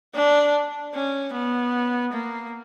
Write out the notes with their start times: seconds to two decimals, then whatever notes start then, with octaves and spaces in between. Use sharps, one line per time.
0.15 D4
0.94 C#4
1.34 B3
2.13 A#3